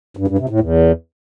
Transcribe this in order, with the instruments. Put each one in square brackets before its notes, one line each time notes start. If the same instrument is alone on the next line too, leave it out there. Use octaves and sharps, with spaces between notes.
[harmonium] G2
G2
C3
A2
E2